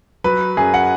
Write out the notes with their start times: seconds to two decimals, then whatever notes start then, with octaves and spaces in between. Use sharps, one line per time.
0.24 F#3 B4
0.57 F#2 G#4
0.74 F#5